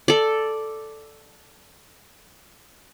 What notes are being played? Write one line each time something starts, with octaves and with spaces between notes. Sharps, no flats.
A4 D5